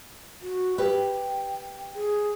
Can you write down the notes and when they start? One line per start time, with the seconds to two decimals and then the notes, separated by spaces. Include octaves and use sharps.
0.42 F#4
0.78 G4 B4 G5
1.95 G#4